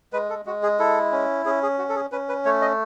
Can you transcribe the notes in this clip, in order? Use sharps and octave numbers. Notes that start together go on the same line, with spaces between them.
G#3 B4
A4
G#3 F#4
G#4
E4 A4
C#4
C#4 G#4
G#4
F#4
A4
G#4
C#4 B4
B4
A3 C#5
D#5